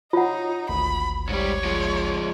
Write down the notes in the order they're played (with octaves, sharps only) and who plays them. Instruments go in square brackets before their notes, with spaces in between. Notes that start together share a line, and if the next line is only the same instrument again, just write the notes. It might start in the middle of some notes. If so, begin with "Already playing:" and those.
[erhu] D#4 [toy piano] F4 F#5 [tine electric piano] C#5
[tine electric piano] G#1 D2 [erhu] B5
[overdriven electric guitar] G#2 G3 [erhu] C#5
[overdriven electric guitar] F3 G#3